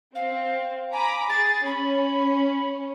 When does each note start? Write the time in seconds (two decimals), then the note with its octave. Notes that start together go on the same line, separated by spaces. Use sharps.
0.15 C4 F5
0.92 G#5 A#5 B5 D6
1.29 G#4 A6
1.65 C#4 B5